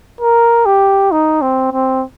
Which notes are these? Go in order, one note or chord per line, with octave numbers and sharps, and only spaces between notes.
A#4
G4
D#4
C4
C4